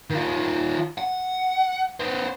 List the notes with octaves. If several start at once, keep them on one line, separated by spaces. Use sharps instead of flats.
D#3 F4
F#5
B3 C5